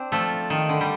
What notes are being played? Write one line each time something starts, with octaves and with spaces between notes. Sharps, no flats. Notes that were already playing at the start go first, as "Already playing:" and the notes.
Already playing: C4 D4
F3 A3
D#3
D3
G3